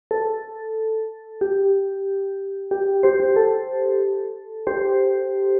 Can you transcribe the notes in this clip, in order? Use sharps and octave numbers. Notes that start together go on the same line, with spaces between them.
A4
G4
G4
G4 C5
G4
A4
G4 C5